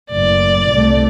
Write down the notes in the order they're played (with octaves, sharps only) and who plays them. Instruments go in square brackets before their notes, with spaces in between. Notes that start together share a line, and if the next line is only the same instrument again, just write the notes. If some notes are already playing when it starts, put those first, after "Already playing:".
[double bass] F#1 A2 [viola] D5
[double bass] C2 A3